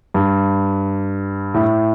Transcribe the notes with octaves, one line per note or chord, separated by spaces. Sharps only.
G2
A2